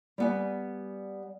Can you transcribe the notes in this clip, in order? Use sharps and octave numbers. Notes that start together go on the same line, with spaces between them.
G3 B3 G#5